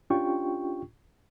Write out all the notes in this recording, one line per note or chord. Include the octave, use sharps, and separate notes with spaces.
C#4 D4 F4 G4 G5 C#6